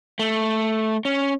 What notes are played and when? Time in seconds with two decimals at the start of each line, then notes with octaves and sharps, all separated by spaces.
0.19 A3
1.05 C#4